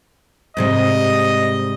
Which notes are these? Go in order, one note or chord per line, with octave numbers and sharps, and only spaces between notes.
G#2 C3 G3 D#5